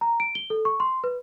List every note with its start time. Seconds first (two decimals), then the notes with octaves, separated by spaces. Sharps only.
0.01 A#5
0.20 D7
0.35 G7
0.50 A4
0.65 C#6
0.80 C6
1.04 B4